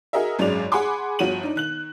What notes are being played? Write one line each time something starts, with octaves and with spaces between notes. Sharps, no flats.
F#4 G#4 A#4 D#5 E5
G#1 F#2 G#3 D5 F7
G#4 F#5 G#5 B5 C6 D6
G1 F3 F#4 C#5 D#7 F#7
D4 D#4
D#3 F#6 F#7